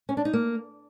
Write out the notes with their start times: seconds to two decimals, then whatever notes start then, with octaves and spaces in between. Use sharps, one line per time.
0.09 C#4
0.17 D4
0.25 D#4
0.33 A#3